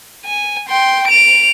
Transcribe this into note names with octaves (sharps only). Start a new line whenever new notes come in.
G#5
G5 C6
D7 F7